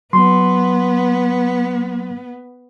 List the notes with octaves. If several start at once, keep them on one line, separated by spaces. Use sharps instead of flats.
F#3 B3 C6